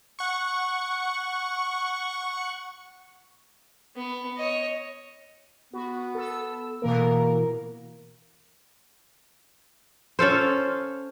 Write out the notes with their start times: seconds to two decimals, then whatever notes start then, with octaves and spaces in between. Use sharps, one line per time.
0.19 F#5 C#6
3.96 B3
4.37 C#5 D#5
5.73 B3 F#4
6.15 A4 E6
6.82 B2 E3 A#3 A#4
10.19 C#4 F4 A4 C5